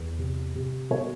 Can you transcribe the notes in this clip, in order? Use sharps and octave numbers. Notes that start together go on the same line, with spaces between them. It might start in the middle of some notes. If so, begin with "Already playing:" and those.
Already playing: E2
C3
C3
B2 C#5